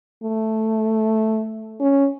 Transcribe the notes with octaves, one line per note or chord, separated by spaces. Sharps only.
A3
C#4